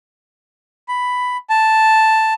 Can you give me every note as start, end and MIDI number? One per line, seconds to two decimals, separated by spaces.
0.88 1.37 83
1.50 2.33 81